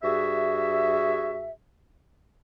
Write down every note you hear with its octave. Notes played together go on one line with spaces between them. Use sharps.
G2 F#4 G#4 E5